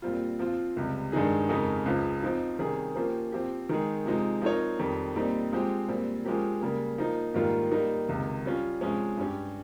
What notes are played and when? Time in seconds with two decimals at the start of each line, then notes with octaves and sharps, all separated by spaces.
0.02 A#2 G3 C4 F4
0.39 F3 C4 F4
0.76 C#2 C3 G3
1.12 G2 D#3 G#3 D#4 G#4
1.49 F2 C#3 G#3 D#4 A#4
1.85 C#2 C#3 F3
2.23 F3 C4 D#4
2.59 C3 D#3 G3 C#4 G#4
2.95 F3 A#3 C#4 G4 C5
3.32 F3 C4 G4
3.69 D#3 G#3 D#4 G#4
4.05 C3 F3 G#3 D#4
4.42 F3 C4 D#4 A#4 C#5
4.79 F2 D#3 G3
5.16 A#2 G3 C4 D#4
5.52 F3 G#3 C4 G4
5.89 A#2 G3 C4
6.24 F3 G#3 C#4 G4 A#4
6.61 C#3 G3 A#3
6.98 F3 A#3 D#4
7.34 G#2 D#3 G3 A#3 F4
7.72 G3 A#3 D#4
8.09 C#2 C3 D#3
8.45 G3 C#4 F4
8.81 C3 F3 G#3 C#4
9.17 G2 G3 C#4 G4